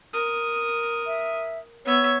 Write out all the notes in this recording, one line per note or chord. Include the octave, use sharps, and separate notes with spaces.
A#4 D#6
E5
B3 C#5 E5